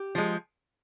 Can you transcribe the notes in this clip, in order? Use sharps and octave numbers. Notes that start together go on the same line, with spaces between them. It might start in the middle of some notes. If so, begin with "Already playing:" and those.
Already playing: G4
F3 G#3